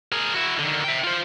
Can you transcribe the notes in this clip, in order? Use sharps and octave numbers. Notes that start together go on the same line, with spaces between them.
G#4 A#4
E4 F#4
D3 D#3
E5 G5
F4 C5